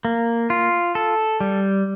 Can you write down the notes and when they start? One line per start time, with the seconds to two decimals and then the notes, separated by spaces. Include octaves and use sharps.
0.05 A#3
0.50 F4
0.95 A4
1.40 G3